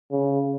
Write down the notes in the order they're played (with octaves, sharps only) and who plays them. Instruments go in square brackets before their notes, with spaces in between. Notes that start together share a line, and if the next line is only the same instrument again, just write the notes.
[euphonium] C#3